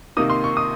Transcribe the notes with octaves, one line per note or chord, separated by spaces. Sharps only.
C3 D#3 A#3 D#4 D#6
C6
C#6
D#6